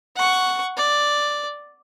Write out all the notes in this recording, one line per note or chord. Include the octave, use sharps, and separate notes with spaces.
F#5 C#6
D5